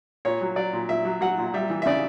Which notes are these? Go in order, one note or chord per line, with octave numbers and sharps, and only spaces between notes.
A#2 C#5
F#3
F#3 D5
A#2
A#2 E5
F#3
F#3 F#5
A#2
G3 E5
E3
E5
C#3 D5